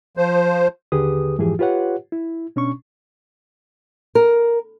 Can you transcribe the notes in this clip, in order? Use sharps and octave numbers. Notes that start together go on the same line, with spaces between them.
F3 C5
D#2 D3 G4 G#4 B4 D#6
F2 G#2 E3 F3 G4 G#4
F4 G4 B4 C#5 F#5
E4
B2 C#4 D4 C#6
A#4